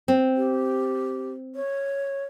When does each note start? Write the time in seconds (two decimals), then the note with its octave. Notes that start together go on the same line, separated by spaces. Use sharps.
0.08 C4
0.36 G4
1.55 C#5